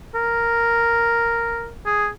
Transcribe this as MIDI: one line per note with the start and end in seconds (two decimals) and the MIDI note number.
0.15 1.71 70
1.86 2.08 68